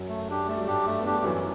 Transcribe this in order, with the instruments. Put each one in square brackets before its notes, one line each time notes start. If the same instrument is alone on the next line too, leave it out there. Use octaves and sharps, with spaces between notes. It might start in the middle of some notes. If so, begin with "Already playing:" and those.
Already playing: [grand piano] F#2 F#3
[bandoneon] A3
D4 G4
[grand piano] G3 [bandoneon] A3
[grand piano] F#3
[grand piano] G2 G3 [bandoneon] D4 G4
[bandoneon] A3
[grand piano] B3
[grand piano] A3 [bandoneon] D4 G4
[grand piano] G3
[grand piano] F#2 F#3 [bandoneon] E3